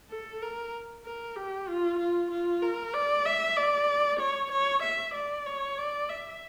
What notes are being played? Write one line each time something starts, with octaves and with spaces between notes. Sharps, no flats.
A4
A#4
A#4
G4
F4
F4
F4
A#4
D5
E5
D5
C#5
C#5
E5
D5
C#5
D5
E5